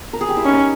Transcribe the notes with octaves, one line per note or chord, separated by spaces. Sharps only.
A#4
G#4
G4
E4
C#4 D#4